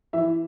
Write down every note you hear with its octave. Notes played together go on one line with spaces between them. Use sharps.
E3 E5